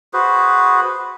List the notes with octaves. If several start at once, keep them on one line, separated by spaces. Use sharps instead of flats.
F#4 G#4 B4 C5